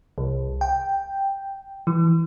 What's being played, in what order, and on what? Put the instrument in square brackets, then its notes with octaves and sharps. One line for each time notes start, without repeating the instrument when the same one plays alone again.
[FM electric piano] C2
G5
E3